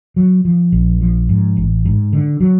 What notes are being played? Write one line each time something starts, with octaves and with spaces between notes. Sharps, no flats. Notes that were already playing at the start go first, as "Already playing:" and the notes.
F#3
F3
A#1
F3
G#2
A1
G#2
D3
F#3